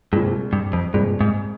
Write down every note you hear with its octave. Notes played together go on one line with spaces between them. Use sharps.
C2 G2 A#2 G#3
G2
F2
C2 G2 A#2 G#3
G#2